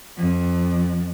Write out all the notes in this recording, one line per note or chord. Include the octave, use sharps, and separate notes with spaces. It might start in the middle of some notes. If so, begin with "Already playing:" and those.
F2